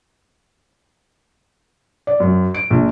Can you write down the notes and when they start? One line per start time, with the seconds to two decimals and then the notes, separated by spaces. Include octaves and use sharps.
2.07 D5
2.20 F#2
2.54 D7
2.70 A#1